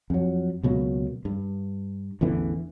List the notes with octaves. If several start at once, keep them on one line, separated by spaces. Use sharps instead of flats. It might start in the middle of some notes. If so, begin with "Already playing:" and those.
F2 F#3
C#2 B2 F#3 A#3
G2
A1 E2 D3 E3